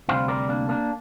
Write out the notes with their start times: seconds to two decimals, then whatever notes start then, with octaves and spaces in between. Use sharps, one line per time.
0.08 D2 C3 G3 C5 F5
0.28 A#4 D5
0.49 A#3 D4
0.69 A#3 D4